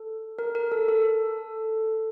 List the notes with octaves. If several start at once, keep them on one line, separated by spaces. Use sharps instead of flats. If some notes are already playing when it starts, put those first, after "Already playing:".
Already playing: A4
A#4
A#4
A4
A4